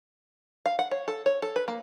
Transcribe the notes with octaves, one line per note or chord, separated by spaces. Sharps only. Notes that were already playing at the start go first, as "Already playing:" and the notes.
F5
F#5
C#5
A4
C#5
A4
B4
A#3